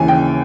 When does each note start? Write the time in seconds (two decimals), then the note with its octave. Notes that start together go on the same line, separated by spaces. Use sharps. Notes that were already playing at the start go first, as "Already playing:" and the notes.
Already playing: D#2 C#3 E3 G#5
0.08 G5